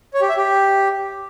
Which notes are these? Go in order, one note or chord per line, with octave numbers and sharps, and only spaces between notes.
C#5
G4
E5
G4